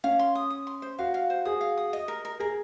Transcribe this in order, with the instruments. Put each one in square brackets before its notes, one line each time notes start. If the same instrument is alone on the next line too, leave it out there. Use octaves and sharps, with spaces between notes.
[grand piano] C#4 [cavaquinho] F5
[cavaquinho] C6
D#6
D#6
C6
C5
[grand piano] F#4 [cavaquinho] F5
[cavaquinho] F5
C5
[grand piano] G#4 [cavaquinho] D#6
[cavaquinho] F5
D#6
D#5
A#4
A#4
[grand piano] G#4 [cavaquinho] A#4